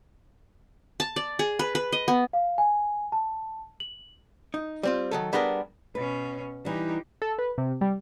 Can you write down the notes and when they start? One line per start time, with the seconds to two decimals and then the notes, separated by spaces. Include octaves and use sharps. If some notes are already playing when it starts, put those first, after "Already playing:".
1.00 A5
1.16 D5
1.39 G#4
1.59 B4
1.75 B4
1.92 D#5
2.08 B3
2.33 F5
2.58 G#5
3.12 A5
3.80 F#7
4.54 D#4
4.83 G3 C4 F4
5.11 D#3 F#3 A4
5.33 G3 B3 D4 G4 G#4 A#4
5.95 B2 C#4 B4
6.65 E3 G3 D#4 G4
7.22 A4
7.39 B4
7.58 C3
7.81 G3